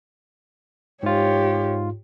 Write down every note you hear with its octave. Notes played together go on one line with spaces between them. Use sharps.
G#2 F4 G4 C#5